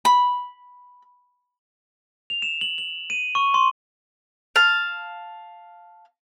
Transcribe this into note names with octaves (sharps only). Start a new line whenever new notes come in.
B5
F7
E7
F#7
F#7
D#7
C#6
C6
F5 A5